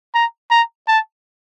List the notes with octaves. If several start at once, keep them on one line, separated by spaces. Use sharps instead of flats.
A#5
A#5
A5